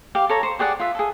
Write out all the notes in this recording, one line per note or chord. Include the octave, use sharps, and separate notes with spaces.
G4 F5
A4 C#5 A#5
C5 C#6
G4 G#4 D5 F#5
F4 E5
G#4 A4